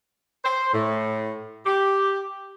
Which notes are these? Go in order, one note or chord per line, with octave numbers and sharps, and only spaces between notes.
C5
A2
G4